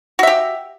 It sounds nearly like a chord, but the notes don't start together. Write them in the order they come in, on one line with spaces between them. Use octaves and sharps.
F#4 E5 G4